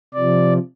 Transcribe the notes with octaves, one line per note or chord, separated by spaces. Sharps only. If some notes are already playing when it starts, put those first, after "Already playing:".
C3 F3 D5